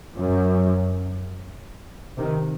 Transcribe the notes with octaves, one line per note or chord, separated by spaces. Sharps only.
F#2
C3 D#3